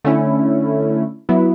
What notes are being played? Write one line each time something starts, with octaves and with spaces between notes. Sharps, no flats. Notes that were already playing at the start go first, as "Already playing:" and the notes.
D3 A3 C#4 E4
F#3 B3 E4